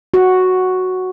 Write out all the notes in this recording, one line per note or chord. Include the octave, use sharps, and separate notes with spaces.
F#4